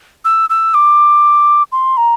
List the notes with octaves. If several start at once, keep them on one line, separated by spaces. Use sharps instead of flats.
E6
E6
D6
C6
A#5